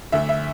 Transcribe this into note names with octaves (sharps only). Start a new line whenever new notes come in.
D2 E5
E5